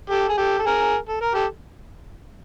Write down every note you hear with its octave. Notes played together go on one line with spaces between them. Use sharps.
G4 A4
G#4
G4 A4
A4
G#4 A#4
A4
A#4
G4 A4